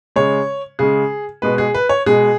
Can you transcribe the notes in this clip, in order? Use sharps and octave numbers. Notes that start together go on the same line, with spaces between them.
C#3 G#3 C#5
C#3 G#3 G#4
B2 G#3 B4
G#4
B4
C#5
B2 G#3 G#4